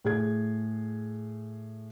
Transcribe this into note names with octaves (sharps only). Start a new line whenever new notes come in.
A2 G#4 G#6